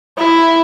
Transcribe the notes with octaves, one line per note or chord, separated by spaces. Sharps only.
E4